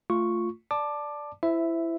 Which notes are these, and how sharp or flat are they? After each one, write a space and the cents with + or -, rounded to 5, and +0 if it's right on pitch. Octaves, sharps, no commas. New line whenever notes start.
A3 +15 F4 +0 C#6 +0
D5 +0 A5 +0 D6 +15
E4 +15 C5 -15 E5 +0